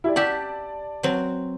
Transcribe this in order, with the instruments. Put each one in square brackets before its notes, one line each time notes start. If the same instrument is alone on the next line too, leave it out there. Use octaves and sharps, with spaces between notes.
[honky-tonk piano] E4 G4 D5
[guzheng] G4 E5 F#5 [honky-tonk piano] D5 A5
[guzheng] F#3 C4